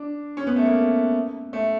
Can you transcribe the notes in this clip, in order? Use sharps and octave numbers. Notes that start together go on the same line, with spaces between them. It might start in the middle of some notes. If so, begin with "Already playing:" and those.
Already playing: D4
C#4
B3
A3
A#3
A3